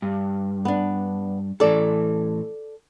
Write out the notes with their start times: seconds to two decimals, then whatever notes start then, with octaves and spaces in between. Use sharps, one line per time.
0.02 G2
0.65 B3 D4
1.60 A2 E3 A4 D5